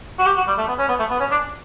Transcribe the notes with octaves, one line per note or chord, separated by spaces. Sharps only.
F#4
G4
F#4
G3
A3
B3
C#4
B3
A3
B3
C#4
D4